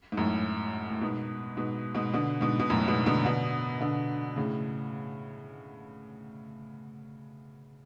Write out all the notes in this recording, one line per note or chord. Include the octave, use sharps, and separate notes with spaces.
G#2
F#2 A2
A2
G#2 B2
G#2 B2
G#2 B2
B2 D3
G#2 B2
B2
F#2 A2
G#2 B2
B2 D3
B2 D3
B2 D3
A2 C#3